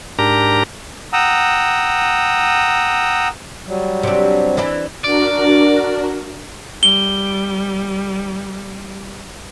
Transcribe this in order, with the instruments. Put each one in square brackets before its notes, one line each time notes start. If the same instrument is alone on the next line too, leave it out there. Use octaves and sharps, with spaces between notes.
[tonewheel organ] G#2 D4 G4 A#4 A#5
[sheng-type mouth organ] F#5 G5 A#5 D#6 E6
[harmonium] F#3 G3
[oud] C3 D4
E3 D4 E4
[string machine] D4 F#4 A#4 [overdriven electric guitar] D5
[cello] G3 [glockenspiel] G7